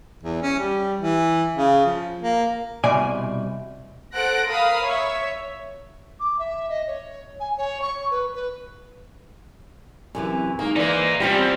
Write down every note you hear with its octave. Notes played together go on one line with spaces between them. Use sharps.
E2
C#4
G3
E3
C#3
F3
A#3
C2 B2 D5 G#5
A4 C5 F#5 F#6 A#6 D7
A#4 F5 B5 D#6
C#5 E5
D6
E5
D#5
C#5
G#5
C#5
C#6
B4
B4
F#2 C3 E3
D#3 G#3 A#3
E3 A#3 D#4 G#4 C5 D5
E2 C3 G3 C4 C#4 F4 G4